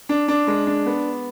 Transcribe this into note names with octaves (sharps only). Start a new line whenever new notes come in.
D4
D4
G#3
D4
B3